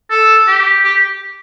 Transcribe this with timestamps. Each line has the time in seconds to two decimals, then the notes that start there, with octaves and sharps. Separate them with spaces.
0.10 A4
0.48 G4
0.84 G4